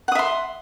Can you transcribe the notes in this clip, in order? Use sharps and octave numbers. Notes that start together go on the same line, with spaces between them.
E5 F#5 C6 D#6